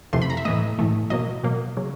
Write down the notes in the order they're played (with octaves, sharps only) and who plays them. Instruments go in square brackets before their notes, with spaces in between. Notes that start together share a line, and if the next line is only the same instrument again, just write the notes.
[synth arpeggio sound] F2 C3 E3 A3 C6
B5
A#5
E5
A2 E3 A3 D#5
A2 E3 A3
B2 F#3 A#3 D#5
B2 F#3 A#3
C#3 F#3